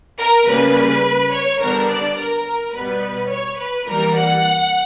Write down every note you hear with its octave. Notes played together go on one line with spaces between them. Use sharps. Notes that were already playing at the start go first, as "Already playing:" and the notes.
A#4
C#3 G3 A#3 C#4 B4
C#5
D3 G3 B3 D4 A#4
D5
A#4
A#4
B2 G3 B3 B4
C#5
B4
E3 G3 A#3 A#4
F#5